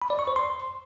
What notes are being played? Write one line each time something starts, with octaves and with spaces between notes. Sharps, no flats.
B5
D5
C#6
C5
C6